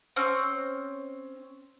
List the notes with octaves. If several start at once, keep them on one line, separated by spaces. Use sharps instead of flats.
C4 C#4